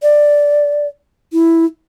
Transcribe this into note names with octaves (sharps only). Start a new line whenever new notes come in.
D5
E4